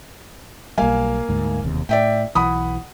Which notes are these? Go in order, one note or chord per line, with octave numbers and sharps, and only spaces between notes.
B1 G3 A#3 F5 G#5
D2 G#2
E1 D#2 C3
A2 D5 E5 G5
B1 E3 F#5 B5 D#6